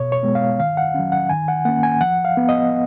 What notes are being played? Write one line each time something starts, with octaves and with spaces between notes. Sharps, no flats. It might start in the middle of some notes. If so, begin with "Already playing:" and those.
Already playing: B2 C#5
C#5
G#3 B3
F5
D#3 F5
F#5
F#3 C#4
F#5
D#3 G#5
F#5
A#3 C#4 F#5
G#5
F3 F#5
F5
B3
D#5